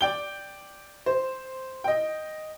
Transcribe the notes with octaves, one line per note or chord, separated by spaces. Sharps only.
D5 G5 G7
C5
D#5 G5